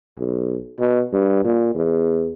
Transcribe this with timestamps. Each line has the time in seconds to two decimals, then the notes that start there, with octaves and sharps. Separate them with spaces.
0.19 B1
0.79 B2
1.13 G2
1.45 A#2
1.75 E2